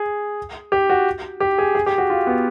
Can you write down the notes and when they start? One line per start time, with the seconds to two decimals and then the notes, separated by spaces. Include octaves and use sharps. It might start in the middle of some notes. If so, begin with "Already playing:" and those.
Already playing: G#4
0.72 G4
0.90 F#4
1.40 G4
1.58 G#4
1.75 G#4
1.86 G4
1.98 F#4
2.10 F4
2.27 B3